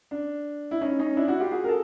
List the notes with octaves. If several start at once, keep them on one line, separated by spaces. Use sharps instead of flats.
D4
E4
C#4 D#4
C#4 D#4
D4 E4
E4 F#4
F4 G4
F#4 G#4
A#4
A4